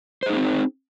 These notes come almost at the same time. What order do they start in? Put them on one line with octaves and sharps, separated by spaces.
C5 G#4 D#4 A#3 C4